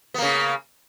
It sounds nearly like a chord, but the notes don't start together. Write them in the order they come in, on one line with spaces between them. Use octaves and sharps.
B3 A#3 C#3